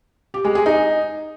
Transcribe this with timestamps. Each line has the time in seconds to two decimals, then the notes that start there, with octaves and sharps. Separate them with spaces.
0.34 G4
0.45 G#3
0.55 G#4
0.66 D#4